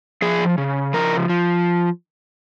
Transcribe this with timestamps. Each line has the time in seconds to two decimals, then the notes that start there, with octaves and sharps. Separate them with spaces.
0.22 F3 G#4
0.58 C#3
0.93 F3 A#4
1.29 F3